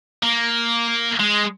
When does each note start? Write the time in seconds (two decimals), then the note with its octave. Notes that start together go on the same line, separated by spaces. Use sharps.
0.22 A#3
1.19 G#3